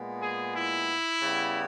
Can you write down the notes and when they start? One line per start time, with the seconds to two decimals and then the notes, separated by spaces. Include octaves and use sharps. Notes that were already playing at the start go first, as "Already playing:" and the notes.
Already playing: A#2 G#3 B3
0.22 G#4
0.55 E4
1.22 C#3 G3 B3